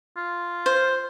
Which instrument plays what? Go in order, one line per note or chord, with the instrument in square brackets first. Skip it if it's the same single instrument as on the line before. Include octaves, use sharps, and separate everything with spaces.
[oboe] F4
[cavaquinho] C5